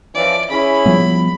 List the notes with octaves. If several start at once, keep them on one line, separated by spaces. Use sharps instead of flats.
E3 F3 C#4 D5
C#4 E4 G#4 B5
F3 G3 B3